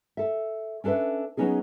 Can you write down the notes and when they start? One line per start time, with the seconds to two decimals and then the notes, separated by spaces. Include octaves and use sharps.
0.17 A4 E5
0.84 C#4 D4 A4 B4 E5
1.37 F#3 B3 C#4 D#4 G#4